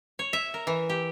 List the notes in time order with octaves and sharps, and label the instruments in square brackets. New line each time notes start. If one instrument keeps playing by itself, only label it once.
[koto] C#5
E5
A#4
E3
G4